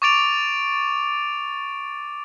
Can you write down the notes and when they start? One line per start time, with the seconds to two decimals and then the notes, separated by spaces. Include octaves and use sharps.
0.02 C#6 D6 A6 D7 F7